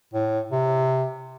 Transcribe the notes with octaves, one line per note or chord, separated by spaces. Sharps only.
A2
C3